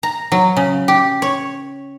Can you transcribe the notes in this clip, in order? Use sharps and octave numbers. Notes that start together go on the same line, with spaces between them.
A#5
F#3
C#3
G4
C#5